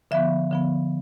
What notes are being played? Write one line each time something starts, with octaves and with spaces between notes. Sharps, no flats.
D3 F3 B3 E5
D3 F3 B3